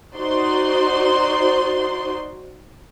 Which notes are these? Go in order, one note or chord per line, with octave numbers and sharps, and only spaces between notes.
D#4 F#4 C5 D5 C6